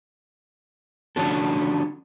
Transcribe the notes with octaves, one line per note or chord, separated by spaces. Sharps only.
D3 F3 C#4 D4 F#4 A4